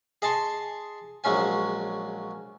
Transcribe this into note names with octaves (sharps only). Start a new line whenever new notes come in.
G#4 D#5 A5 C6 C#6
A#1 F#3 G#3 C#4 G#5